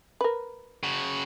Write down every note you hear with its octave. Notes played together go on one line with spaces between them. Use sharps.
A#4 B4
C#3 F#4